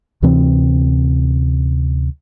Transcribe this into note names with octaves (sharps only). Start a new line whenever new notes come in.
D2 C3 E3 C4